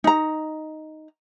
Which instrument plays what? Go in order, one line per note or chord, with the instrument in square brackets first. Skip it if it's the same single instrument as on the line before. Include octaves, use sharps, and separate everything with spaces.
[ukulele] D#4 A#5